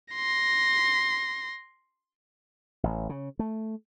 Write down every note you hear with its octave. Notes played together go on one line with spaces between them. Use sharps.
C6 A#6
A1
C#3
A3